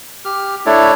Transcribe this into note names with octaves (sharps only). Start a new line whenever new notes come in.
G4 F6
A3 D4 E4 A4 C#5 D5